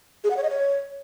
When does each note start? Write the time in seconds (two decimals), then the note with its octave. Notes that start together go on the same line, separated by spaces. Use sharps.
0.24 G#4
0.30 F#5
0.37 C#5
0.43 D#5
0.50 C#5